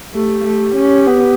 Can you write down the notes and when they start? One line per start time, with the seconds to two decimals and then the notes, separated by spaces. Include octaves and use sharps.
0.14 A3 G4
0.45 A3
0.75 C#4
1.06 B3